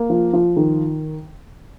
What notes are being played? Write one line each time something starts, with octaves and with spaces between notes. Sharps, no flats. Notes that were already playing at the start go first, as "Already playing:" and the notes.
Already playing: A#3
F3
F3
D#3